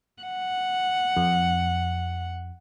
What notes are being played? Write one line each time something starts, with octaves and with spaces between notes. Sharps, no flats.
F#5
F2